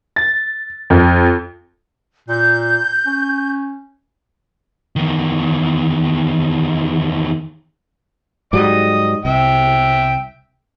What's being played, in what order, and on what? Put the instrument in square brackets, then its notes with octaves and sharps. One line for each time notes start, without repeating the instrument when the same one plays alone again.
[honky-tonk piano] A6
F2
[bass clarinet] A#2 [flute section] G6
[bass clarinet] C#4
[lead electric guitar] E2 D#3
[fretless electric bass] G#2 F#3 G3 [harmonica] D#5 D#6
[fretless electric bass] C2 [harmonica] E5 G5